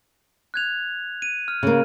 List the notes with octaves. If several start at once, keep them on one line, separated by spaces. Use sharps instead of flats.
F#6 G#6 F7
D#7
F6
C#3 A#3